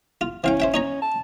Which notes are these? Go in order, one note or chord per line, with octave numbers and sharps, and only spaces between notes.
F4
E3 C#4 F5 G5
C5 E5 G5
D#4 C#5 A#5
A5